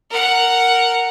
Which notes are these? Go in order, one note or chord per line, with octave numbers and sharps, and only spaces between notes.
A#4 F#5